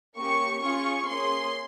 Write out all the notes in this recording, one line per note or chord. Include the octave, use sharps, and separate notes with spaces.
A#3 C#4 G4 C#6
C#4 F4 G#4 C#6
A#3 C#4 G#4 C6